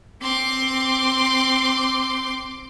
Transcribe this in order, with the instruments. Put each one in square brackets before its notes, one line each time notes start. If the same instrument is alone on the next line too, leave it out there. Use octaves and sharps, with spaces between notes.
[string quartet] C4 C6 D6